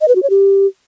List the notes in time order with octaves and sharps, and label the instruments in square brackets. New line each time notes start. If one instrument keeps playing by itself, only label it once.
[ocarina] D#5
B4
F#4
C#5
G4